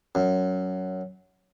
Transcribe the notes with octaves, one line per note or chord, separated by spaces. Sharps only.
F#2